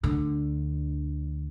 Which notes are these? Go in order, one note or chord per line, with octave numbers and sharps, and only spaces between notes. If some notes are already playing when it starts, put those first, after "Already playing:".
D2 D3